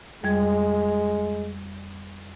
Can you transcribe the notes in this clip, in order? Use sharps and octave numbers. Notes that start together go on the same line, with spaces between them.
F2 G3 G#3 G#6